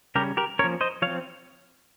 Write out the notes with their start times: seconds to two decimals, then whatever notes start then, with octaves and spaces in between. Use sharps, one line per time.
0.15 C#3 G3 C#4 G4 A#4
0.37 G4 A#4
0.59 F3 A#3 C#4 A#4 C#5
0.81 C5 D#5
1.02 F3 C4 C#5 F5